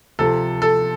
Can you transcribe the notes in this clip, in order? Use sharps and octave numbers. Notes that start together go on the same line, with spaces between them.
C3 F3 A4
A4